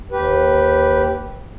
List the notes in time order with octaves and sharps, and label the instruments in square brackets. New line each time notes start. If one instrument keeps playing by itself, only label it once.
[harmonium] D#2 G4 B4